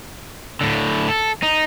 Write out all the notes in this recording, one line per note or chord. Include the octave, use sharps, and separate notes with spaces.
A2 D3
A4
D#4